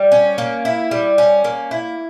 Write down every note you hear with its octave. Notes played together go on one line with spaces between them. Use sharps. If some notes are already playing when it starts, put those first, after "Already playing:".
Already playing: G3
C#4
A#3
E4
G3
C#4
A#3
E4